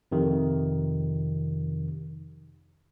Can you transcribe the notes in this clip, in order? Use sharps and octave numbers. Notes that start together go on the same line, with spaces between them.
F2 C3 D#3